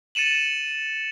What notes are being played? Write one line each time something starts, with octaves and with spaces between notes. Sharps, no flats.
A6 C#7 D#7 E7 F#7